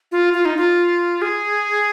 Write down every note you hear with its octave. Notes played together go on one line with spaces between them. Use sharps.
F4
F4
D#4
F4
G#4